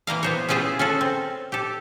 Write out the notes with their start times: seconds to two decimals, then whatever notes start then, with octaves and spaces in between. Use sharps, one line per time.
0.07 E3 A#3 A#4 F5
0.23 B3 C5 C#5
0.49 C#4 E4 F4 G#4 C5
0.79 C#4 F4 F#4 A4
1.01 C4
1.52 G4 A4